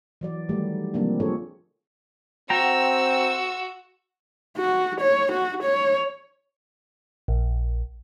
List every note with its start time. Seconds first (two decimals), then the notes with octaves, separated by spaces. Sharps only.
0.21 E3 F#3 D5
0.49 D#3 F#3 G3 A3 G4
0.94 C3 F3 G3 A#3 C4 D4
1.20 C4 D4 F4 G#4 A4 C#5
2.50 C4 F#4 G5 A#5 E6
4.58 F#4
5.00 C#5
5.32 F#4
5.63 C#5
7.28 A#1